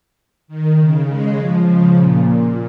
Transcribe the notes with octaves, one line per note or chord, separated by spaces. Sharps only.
D#3
C#3
G#3
F3
C#3
A#2